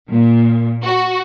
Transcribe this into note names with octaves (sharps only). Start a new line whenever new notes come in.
A#2
F#4